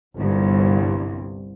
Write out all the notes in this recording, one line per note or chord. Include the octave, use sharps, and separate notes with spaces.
G1 C2 G2